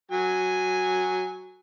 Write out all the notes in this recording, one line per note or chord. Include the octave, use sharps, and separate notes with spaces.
F#3 G#5